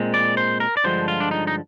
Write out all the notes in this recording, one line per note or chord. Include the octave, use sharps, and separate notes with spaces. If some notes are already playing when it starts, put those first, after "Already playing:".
Already playing: A#2 G#3 C4
D5
C5
A#4
D5
G2 D3 F3 G#3 C5
F4
D4
D#4
D#4